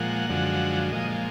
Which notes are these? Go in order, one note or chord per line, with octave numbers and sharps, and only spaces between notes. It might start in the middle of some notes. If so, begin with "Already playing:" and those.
Already playing: A#2 F3 G#3 F#5
F#2 D3 F3 G#3
A#2 F3 G#3 D#5